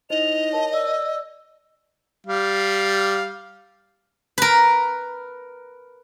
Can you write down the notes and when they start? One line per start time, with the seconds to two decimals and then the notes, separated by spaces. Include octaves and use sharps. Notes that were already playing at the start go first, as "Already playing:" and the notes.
0.10 D#4 E4 C5 D#5 F7
0.52 A#4 C#5 A5
0.73 D5 E6
2.27 G3 F5
4.38 A#4 B4